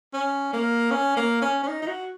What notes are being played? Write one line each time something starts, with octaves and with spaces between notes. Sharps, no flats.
C#4
A#3
C#4
A#3
C#4
C#4
D#4
D#4
F#4